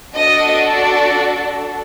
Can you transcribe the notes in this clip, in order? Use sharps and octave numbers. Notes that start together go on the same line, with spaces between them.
D4 F#4 A4 D#5
D5